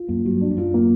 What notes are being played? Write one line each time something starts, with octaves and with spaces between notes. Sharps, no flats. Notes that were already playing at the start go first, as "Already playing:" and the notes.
Already playing: F4
F#2 A#3
G2 F#3
D4
G2
F#2 F4
A#3